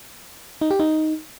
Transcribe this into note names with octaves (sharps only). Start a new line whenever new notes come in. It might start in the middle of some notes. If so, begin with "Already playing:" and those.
D#4
G4
D#4